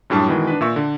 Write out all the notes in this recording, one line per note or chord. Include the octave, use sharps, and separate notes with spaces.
F#2 A2 G3 D4 A5
B2 D#3 E3 G#3
D4 B4
A#2 E5 C#6
D3